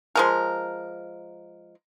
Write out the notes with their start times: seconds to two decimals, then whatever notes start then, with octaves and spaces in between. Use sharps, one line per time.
0.15 F3 G#3 A#4